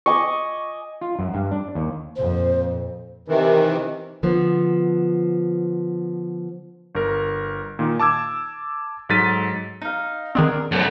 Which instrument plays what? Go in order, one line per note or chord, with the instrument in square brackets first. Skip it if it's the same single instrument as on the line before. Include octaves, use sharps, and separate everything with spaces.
[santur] D#5 G#5 D6 [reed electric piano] C#6
[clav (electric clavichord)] F4
F#2
G2
D4
D#2
[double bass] F2 A#2 [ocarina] C5
[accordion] C3 D#3 E3
[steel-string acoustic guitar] D3 F3 B3
[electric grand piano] G1 A#4
A#2 D#3
A5 D6 E6 G#6
G#2 F#3 A4 A6 B6 D#7
[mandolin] D#4 F5
[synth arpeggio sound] D#3 B3 C4 [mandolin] D4 G#4 A#4
[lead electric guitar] F#2 B2 [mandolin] A4 C5